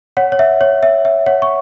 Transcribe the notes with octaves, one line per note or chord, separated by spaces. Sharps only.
C#5 F#5
C#5
E5
C#5
E5
E5
C#5 F#5
C#6